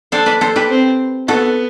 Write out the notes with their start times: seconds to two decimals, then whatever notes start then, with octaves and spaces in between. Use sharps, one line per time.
0.12 D4 A4 C5
0.26 B4 D5
0.41 A4 C5
0.56 G4 B4
0.70 C4
1.28 B3 F#4 A4